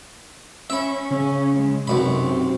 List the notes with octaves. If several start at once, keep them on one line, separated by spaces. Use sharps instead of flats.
C#4 E5 B5
C#3 C#4
G#3
B1 F#2 C3 B5
C4